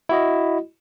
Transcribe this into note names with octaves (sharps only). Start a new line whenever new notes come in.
E4 F#4 D#5